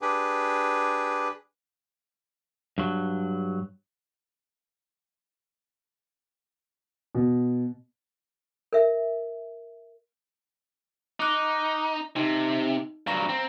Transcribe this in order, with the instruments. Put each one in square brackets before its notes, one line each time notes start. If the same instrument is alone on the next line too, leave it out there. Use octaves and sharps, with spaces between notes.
[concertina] D4 G4 G#4 B4
[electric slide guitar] G2 F#3
[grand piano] B2
[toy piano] A#4 E5
[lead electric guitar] D#4 [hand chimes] D6 F#6
[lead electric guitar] C3 [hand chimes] D#4
[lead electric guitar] G2 F#3 [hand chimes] F5 A#5 A#6
[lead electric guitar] C4